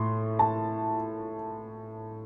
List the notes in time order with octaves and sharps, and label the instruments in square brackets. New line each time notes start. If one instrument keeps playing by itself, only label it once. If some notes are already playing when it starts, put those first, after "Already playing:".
Already playing: [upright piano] A2 A3 C6
A5